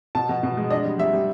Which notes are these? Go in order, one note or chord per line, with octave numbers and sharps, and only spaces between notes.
B2 A5
B2
B2
G#3
D4 D#5
G3
G3 E5
G3